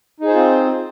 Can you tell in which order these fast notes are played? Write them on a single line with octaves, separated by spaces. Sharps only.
D#4 G#4 C5 F4 C4